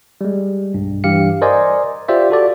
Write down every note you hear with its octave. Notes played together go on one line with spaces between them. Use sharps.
G3 G#3
B1 G2
G2 E3 G4 F5 C#7
A#4 C5 D5 D#5 G#5 C6
F4 G4 C5 D5 E5
F#4 A4 D5